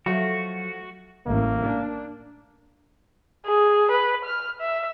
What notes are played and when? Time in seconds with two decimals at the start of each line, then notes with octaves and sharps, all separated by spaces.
0.06 F3 F#3 A3 F#4
1.26 A1 A#3
1.64 D4
3.47 G#4
3.91 B4
4.25 F6
4.61 E5